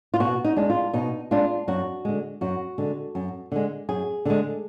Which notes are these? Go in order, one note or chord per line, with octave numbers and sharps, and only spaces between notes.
F4
B2 F#4
D#4
G#3 D4
F4
B2 D#4
G#3 D4 F4
F#2 F#4
D3 G#3
F#2 F#4
D3 G#3
F#2
D3 G#3
F#2 G#4
D3 G#3